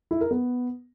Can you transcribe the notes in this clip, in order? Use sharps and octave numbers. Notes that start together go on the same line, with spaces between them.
E4
A#4
B3